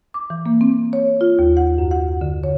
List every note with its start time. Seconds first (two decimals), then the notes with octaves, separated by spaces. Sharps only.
0.14 D6
0.30 E3
0.46 A#3
0.61 C4
0.93 C#5
1.21 F4
1.39 D#2
1.57 F#5
1.78 F#2
1.91 F#5
2.21 D3
2.44 C#5